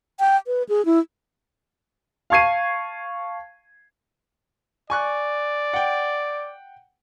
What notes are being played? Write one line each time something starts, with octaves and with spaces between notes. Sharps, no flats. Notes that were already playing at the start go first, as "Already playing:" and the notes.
G5
B4
G#4
E4
F5 A5 C#6 G#6 C7 D#7
D5 G#5 C#6 F#6
F#5 G5